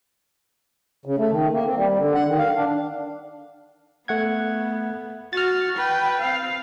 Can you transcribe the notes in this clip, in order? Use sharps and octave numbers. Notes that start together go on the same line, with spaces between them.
C#3
A3
D#3
A#3
C4
G3
D3
F#5
D#3
F5
D4
A3 B3 F#5 G#6
F#4 F6 A6
B4 G5
C4 F5